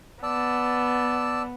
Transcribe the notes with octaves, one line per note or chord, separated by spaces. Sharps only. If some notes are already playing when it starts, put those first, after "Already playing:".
B3 D5 A5 E6